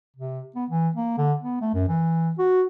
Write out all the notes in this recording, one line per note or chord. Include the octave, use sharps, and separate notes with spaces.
C3
B3
E3
A#3
D3
B3
A3
F#2
E3
F#4